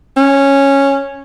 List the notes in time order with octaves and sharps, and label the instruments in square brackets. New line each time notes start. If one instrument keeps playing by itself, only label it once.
[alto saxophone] C#4